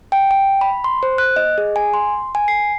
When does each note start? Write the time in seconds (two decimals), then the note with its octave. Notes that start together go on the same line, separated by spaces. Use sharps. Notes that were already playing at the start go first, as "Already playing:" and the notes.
0.12 G5
0.31 G5
0.61 B5
0.84 C6
1.03 C5
1.18 F#6
1.36 D#5
1.58 G#4
1.76 G#5
1.94 C6
2.35 G#5
2.48 C7